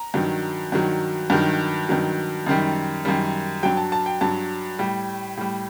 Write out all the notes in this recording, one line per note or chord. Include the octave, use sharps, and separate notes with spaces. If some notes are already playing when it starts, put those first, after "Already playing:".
Already playing: A#5
G2 D#3 F#3
G2 D#3 F#3
G2 D#3 F#3
G2 D#3 F#3
F#2 D#3 G3
F#2 D#3 G3
G2 F#3 G5
A5
A5
G5
G2 F#3 A5
A2 G3
A2 G3